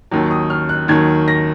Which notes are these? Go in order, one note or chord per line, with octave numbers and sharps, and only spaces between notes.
D#2 D#3 F#3
D#6
F6
F#6
D#2 D#3 F#3 G#6
A#6